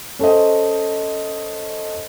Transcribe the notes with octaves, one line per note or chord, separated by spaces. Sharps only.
C#4 A4 C5 D#5